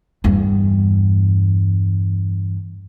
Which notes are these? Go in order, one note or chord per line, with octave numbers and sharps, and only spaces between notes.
E2 G2